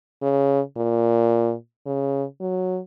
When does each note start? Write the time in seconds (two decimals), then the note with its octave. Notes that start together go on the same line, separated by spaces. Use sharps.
0.22 C#3
0.77 A#2
1.86 C#3
2.40 F#3